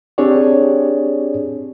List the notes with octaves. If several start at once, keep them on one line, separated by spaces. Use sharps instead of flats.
C4 D4 G4 G#4 C#5 D5